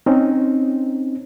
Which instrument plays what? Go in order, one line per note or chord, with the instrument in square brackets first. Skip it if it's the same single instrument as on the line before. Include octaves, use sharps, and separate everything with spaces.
[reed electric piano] C4 C#4 D#4